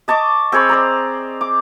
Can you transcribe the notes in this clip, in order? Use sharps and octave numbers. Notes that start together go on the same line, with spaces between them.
D#5 A5 C#6 D6
C4 G#4 C#5 B5
C5 D5 A#5
D6